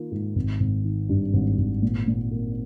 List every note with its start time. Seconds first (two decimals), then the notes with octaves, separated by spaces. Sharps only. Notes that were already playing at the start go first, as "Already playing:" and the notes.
Already playing: D#3 A#3 F4
0.11 G#2
0.36 G#1
0.60 G#1
0.84 D#3
1.09 G2
1.33 G#1
1.58 G#1
1.82 A#2
2.08 A#2
2.31 A#3